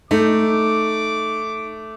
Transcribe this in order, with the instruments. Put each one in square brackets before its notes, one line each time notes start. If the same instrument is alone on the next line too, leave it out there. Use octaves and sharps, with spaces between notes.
[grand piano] A3 [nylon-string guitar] D#4 [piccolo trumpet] D6